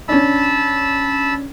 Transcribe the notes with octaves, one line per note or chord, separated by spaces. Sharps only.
C#4 D4 A5 B5 E6